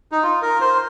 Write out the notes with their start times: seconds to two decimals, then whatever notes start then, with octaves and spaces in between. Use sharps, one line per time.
0.12 D#4
0.23 F4
0.42 A#4
0.61 C5